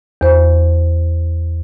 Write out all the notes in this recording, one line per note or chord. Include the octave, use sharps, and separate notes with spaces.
E2 C5